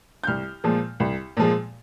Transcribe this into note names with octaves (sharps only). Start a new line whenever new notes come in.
G6
C2 F6
A#2 F3 G#3
C2
A#2 F3 G#3